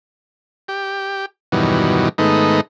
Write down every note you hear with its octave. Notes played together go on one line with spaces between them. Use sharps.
G4
E2 G2 B2 D#3 F#3
G#2 D#3 A3 B3 D#4